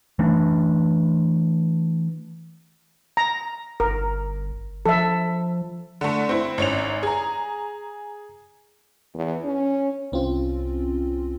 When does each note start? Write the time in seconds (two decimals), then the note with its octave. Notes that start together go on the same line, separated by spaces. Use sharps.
0.19 E3 A3 D4
3.17 A#5
3.80 G1 A#4
4.86 F3 A4 E5
6.01 D3 A3
6.29 C4 E4
6.58 G#1 C#4 F7
7.03 G#4 A#5
9.15 E2
9.45 C#4
10.12 C2 C4 C#4 F4